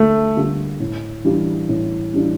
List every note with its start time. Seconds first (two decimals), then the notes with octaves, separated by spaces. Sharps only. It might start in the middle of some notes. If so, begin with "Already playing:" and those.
Already playing: D2 D3 G3 A3 A#3
0.36 D3 G3 A#3 F4
0.80 A2
1.25 E3 G3 D4 F4
1.69 A2
2.13 E3 G3 D4 F4